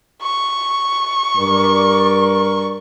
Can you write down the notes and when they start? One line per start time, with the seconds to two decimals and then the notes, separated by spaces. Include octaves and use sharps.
0.22 C#6
1.37 G2 A#4 D5